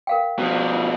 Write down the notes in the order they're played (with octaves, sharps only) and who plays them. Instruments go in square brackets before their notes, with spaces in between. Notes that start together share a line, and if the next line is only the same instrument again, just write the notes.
[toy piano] A#4 F5 G5
[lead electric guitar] B2 F3
[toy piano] F4